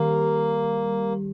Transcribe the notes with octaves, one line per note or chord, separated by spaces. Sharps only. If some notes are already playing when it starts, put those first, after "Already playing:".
Already playing: D#3 G3 A#3 G4